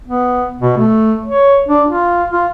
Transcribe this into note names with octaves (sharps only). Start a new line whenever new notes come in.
B3
B2
A3
C#5
D4
F4
F4